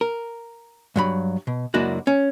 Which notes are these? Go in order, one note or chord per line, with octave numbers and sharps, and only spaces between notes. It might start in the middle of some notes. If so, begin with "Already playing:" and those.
A#4
G2 F#3 B5
B2
C#2 F#2 A#3 D4 E4 F#4
C#4